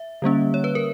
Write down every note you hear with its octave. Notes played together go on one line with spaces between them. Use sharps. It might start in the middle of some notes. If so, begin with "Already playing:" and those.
Already playing: E5
D3 G3 A#3 C#4
C#5
B4
A#4